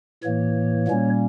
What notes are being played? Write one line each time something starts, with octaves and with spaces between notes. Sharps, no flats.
A2 E3 A#3 C#5
A#2 G3 A#3 C#4